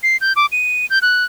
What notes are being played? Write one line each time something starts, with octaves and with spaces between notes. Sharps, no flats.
C7
G6
D6
D#7
G6
F#6